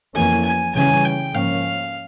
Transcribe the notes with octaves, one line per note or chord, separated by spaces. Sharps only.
F2 E3 A#3 C#4 G#5
G#5
C#3 E3 G3 C#4 G#5
G5
G#2 F3 A#3 C#4 F5